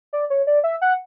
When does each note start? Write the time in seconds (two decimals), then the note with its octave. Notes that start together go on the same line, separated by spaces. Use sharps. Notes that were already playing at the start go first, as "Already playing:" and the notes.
0.13 D5
0.30 C#5
0.47 D5
0.64 E5
0.81 F#5